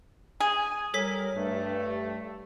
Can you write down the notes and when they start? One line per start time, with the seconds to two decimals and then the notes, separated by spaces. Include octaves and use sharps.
0.40 G#4 G#5
0.94 G3 A4 A#4 C#5 B6
1.35 G2 A3